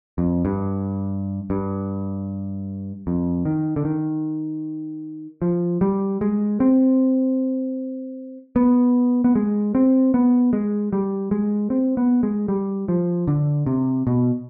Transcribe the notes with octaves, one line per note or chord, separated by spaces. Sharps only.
F2
G2
G2
F2
D#3
D3
D#3
F3
G3
G#3
C4
B3
B3
G#3
C4
B3
G#3
G3
G#3
C4
B3
G#3
G3
F3
D3
C3
B2